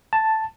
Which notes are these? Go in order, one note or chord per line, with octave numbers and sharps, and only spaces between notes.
A5